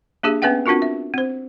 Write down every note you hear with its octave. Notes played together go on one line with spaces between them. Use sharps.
A#3 D4 G4 G#4 E5
B3 C#4 B4 E5 F#5 G5
C4 D4 F4 F#4 A#4
E5
C4 C5